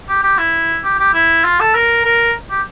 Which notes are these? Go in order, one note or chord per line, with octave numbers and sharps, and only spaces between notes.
G4
G4
E4
G4
G4
E4
F4
A4
A#4
A#4
G4